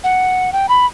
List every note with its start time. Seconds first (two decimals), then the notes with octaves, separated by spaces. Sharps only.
0.04 F#5
0.53 G5
0.69 B5